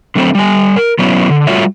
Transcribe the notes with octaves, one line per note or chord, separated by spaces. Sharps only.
D3 F#3 A3 C4 C5
G3 G#5
A#4
F#3 B3 C#4 E4
D3
G3 A3 F4 F#4 C#5 E5